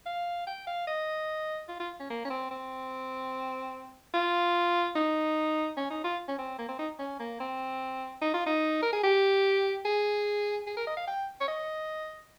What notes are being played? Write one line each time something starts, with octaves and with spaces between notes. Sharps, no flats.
F5
G5
F5
D#5
F4
F4
C#4
A#3
C#4
C4
C4
F4
D#4
C#4
D#4
F4
C#4
C4
A#3
C4
D#4
C#4
A#3
C4
D#4
F4
D#4
A#4
G#4
G4
G#4
G#4
A#4
D#5
F5
G5
C#5
D#5